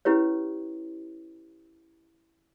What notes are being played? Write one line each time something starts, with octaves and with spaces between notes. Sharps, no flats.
C#4 E4 G4 B4 C#5